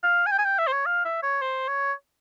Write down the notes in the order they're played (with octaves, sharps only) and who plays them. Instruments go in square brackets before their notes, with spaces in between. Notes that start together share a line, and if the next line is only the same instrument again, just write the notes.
[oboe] F5
G#5
G5
G#5
G5
E5
C5
C#5
F5
E5
C#5
C5
C#5